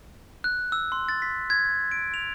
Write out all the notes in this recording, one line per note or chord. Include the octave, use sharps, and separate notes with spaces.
F#6
E6
C6
A6
B6
G#6
D7
F7